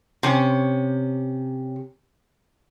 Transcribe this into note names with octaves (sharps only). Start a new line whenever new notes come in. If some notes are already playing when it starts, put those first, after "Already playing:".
C3 C#4